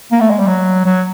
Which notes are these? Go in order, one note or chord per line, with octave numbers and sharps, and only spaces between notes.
A#3
A3
G#3
G3
F#3
F#3